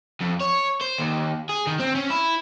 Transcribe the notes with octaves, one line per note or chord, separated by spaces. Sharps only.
F2
C#5
C5
D#2
G#4
D#3
C4
C#4
E4